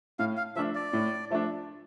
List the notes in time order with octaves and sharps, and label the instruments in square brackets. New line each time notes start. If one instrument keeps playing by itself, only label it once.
[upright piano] A2 [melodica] F5
[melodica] F5
[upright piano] F3 A3 D4 [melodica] E5
[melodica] D5
[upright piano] A2
F3 A3 D4